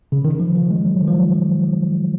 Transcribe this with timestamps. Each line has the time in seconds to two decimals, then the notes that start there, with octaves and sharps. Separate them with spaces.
0.12 C#3
0.25 D#3
0.40 F3
0.56 F3
0.71 G#3
0.86 F#3
1.01 D#3
1.08 F3